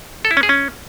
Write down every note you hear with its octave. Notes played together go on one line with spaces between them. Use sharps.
A4
E4
C#4
G#4
C#4